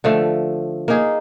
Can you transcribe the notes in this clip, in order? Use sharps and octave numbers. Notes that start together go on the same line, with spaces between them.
D3 F3 A3
A#3 D#4 G#4